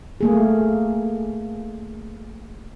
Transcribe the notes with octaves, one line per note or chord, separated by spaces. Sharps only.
A3 A#3 G#4